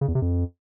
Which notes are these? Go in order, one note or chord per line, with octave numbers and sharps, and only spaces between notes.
C#3
E2
C3
F2